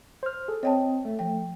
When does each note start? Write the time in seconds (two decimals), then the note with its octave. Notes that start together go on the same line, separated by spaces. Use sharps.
0.23 C5 F6
0.48 G#4 A4
0.63 C4 C#5 D#5 G5 A5
1.05 A3
1.19 F3 G5